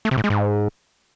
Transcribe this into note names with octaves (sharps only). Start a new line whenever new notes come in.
A3
C3
A2
G#3
G#2